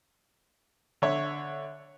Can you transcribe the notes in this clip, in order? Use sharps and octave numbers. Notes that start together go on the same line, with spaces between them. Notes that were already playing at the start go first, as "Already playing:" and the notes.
D3 C#5 E5